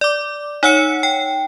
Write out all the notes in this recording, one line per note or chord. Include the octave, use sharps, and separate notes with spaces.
D5 D6
D#4 C#5 F#5 E6 C#7
G5